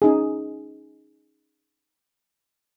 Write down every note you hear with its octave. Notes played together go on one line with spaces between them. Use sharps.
C#4 D#4 G#4